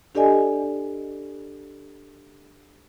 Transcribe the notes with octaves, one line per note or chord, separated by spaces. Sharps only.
D4 G4 A4 D5 D#5 G#5